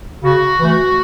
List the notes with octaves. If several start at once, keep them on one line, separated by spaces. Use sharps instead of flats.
C#3 F#4
E3 A3